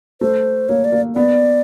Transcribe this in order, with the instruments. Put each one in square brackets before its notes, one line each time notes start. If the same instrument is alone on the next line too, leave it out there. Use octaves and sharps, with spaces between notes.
[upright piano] A3 [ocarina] C5
[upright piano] A#3 [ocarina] C#5
[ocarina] D5
[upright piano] A#3
[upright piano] B3 [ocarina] D5